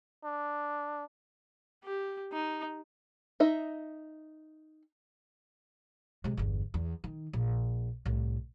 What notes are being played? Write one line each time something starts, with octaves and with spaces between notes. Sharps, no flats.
D4
G4
D#4
D#4 D#5 E5
C3 G#3
G1 E2
E2
D#3
A#1
C2 A2